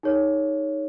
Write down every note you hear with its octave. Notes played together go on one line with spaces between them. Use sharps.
D#4 G#4 A#4 C#5